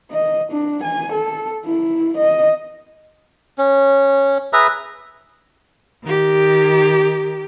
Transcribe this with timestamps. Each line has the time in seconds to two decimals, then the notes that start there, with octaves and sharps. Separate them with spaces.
0.11 D#5
0.52 D4
0.84 G#5
1.13 A4
1.66 E4
2.17 D#5
3.58 C#4
4.53 G#4 B4 E5 A#5
6.04 D#3 G4